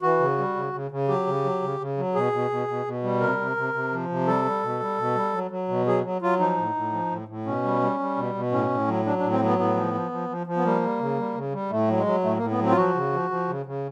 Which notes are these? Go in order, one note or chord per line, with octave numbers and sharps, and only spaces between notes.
E3 F#4
C#3
G3
C#3
C#3
C#3
F#3 G4
C#3
F#3
C#3
C#3
F#3
B2 G#4
B2
B2
B2
B2
G3
C3 A#4
C3
C3
C3
F3
C3
G3 A4
G3
B2
G3
B2
G3
F#3
F#3
B2
F#3 G#4
F#3
F#3 F4
F3 D#4
A2
A2
F3
A2
A2
B2 C#4
G3
G3
G3
B2
B2
A2 C#4
A2
F#3
F#3 D4
D4
A2
C4
F#3 B3
A2 B3
F3
F3
F3
F3
F3
B3
G3 A#3
G3
C#3
G3
C#3
G3
A2 A3
F#3
G#3
F#3
A2 A3
A#3
A2
B3
F#3 C4
F4
F3 F#4
C#3
F3
F3
C#3
C#3